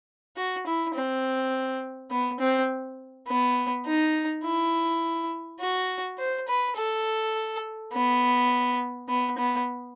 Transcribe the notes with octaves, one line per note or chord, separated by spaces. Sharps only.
F#4
E4
C4
B3
C4
B3
D#4
E4
F#4
C5
B4
A4
B3
B3
B3